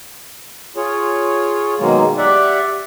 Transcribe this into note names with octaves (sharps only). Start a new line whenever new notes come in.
F4 G#4 C#5
B2 D#3 F#3 G#3 A#3
G4 D5 E5 F#5